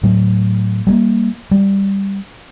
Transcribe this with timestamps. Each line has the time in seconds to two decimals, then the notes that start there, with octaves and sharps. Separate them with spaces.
0.03 A2 F#3 A3
0.87 G3 G#3 A#3
1.51 G3